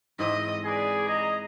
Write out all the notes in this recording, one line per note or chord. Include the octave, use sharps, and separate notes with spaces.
G#2 E3 C4 D#5
G#4 B4 D5
D#5 A#5